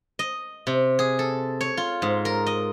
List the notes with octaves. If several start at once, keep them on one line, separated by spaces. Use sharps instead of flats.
D#5
C3
G#4
A4
C#5
F4
G#2
A#4
D#5